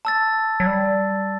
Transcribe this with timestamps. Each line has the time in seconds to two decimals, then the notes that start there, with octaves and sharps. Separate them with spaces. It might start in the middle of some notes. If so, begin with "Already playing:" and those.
0.05 A5 E6 A6
0.60 F#3
0.67 G3